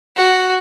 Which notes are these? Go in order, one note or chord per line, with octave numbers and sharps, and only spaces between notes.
F#4